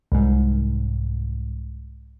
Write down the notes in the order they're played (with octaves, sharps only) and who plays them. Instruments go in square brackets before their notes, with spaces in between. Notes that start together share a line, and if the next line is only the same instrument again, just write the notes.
[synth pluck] C2 G#2